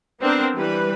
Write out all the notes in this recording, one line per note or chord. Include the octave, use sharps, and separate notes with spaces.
B3 C4 D4 A#4 C5
E3 G3 B4